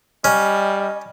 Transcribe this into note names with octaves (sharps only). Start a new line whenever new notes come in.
G3 C#4 D#5 F6